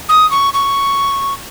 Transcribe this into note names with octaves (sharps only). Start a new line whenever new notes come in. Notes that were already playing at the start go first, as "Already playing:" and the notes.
D#6
C#6
C#6